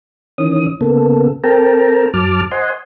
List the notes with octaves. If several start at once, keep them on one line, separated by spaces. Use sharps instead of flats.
D#3 E3 C#4 D#6
C#3 A#3 B3 A4
C4 A4 A#4 G5 A5 A#5
F#2 F#3 A5 D6 F6
C5 D#5 F#5 G#5 C6